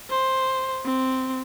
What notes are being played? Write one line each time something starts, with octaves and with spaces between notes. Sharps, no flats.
C5
C4